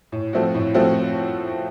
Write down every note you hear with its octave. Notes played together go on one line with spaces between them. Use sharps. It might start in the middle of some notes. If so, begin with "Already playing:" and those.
A2
F3 A3 C4 F#4
A2
F3 A3 C4 F#4